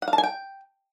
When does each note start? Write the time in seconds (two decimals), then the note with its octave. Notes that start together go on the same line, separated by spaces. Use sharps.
0.02 F#5
0.08 F5
0.13 A5
0.18 G#5
0.24 G5